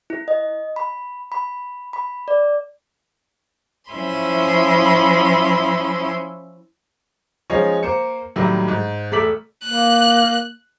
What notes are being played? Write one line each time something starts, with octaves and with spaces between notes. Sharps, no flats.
E4
D#5
B5
B5
B5
D5
F3 C#4 E4 E5 B5 C6
F3 G#3 C#4 D#4 C#5
A#3 C5 C#7
A2 D#3 F#3 G3 A#3
G#2
E1 A3 A4 D6 B6 F#7
A#3 F#6